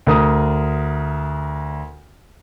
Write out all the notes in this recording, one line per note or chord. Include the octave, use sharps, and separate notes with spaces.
D2 A#4 D#6